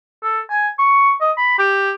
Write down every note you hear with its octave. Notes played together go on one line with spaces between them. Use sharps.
A4
G#5
C#6
D#5
B5
G4